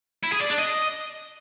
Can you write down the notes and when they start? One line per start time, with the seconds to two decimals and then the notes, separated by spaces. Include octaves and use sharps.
0.23 E4
0.32 G#4
0.41 D5
0.50 D4
0.58 D#5